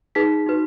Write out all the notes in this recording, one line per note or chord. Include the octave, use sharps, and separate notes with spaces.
D#4 G#4 B4 B6
D#4 F#4 B4